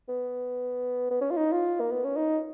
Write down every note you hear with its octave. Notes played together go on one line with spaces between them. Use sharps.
B3
B3
C#4
F4
D#4
F4
A#3
B3
C#4
D#4